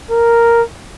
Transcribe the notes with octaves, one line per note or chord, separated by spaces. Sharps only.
A#4